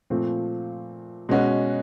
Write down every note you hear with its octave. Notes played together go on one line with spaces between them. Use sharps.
A#2 F3 A3 C4
B2 G#3 C#4 F#4